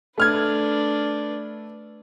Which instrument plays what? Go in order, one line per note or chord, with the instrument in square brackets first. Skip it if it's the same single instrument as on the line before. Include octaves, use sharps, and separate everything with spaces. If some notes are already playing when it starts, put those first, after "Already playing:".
[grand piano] A3 F6 G#6 [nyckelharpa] D4 B4